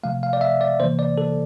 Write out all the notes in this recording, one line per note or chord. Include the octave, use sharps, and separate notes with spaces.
C3 F3 A3 F5
F5
D5
E5
D5
C3 E3 A#3 C5
D5
A4